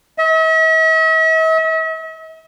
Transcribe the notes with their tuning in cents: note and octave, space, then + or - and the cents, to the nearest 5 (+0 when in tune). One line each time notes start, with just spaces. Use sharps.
E5 -45